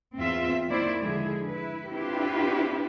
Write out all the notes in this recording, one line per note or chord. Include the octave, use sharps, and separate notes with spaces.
E2 C4 F4 E5
D#3 A#3 E4 C5 D5
D3 F3 G#3 E4 G#4
E4 B4
C4 D4 E4 F4 G4 B4